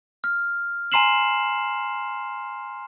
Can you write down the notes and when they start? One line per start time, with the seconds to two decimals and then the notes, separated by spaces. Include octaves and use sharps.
0.24 F6
0.92 G#5 A#5 C6 C7 E7 F#7